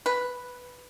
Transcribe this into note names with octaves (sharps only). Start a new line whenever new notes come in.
B4